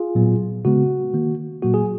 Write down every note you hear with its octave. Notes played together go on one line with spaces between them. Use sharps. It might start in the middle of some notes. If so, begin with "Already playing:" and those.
Already playing: F4 G#4
A#2 F#3 B3
C#3 G#3 B3 F#4
D#3 A#3
A#2 F#3 A#3 F#4
G#4